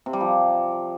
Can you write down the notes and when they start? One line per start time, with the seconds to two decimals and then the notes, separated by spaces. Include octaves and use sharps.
0.06 C3
0.13 G3
0.20 F3